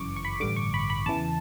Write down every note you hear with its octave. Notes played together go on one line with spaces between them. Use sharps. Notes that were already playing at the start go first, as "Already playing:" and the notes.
Already playing: G1 F#2 C#3 E3 C#6 D6
C#6
B5
A1 G2 D3 D6
C#6
B5
B5
E2 C#3 E3 A5